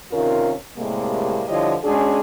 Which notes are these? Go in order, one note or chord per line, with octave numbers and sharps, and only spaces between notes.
C3 D#3 C#4 F4 A#4
A2 C3 G3 G#3 A#3
D3 F3 G3 E4 C#5 D#5
G#3 C#4 D4 F#4 G#4